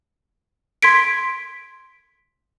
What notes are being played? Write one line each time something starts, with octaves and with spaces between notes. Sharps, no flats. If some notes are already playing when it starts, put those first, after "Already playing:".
C6 G#6 B6 D7